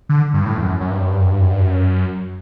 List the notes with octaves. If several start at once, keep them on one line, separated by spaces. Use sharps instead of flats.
D3
G2
A2
E2
F#2
F#2
G2
F#2
G2
F#2
G2
F#2
G2
F#2